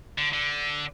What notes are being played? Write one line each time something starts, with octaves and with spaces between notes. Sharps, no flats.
D3
D3